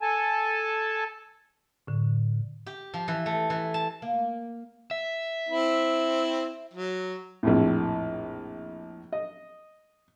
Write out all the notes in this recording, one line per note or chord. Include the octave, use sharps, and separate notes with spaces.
A4 G#5 A5
A2 D3
G4
F3
E3
A3
E3
A5
A#3
E5
C4 E4
F#3
A#1 F2 A2
D#5